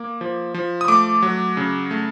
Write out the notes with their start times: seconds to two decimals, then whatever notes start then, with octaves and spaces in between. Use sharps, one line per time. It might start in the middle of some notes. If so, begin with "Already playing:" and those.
Already playing: A#3 D6
0.21 F3
0.54 F3
0.81 D#6
0.88 A3 D6
1.22 F#3
1.57 C#3
1.91 A3